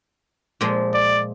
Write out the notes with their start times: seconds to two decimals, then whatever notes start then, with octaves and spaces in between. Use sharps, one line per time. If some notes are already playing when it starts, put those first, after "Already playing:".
0.61 A#2 F3 G#3
0.94 D5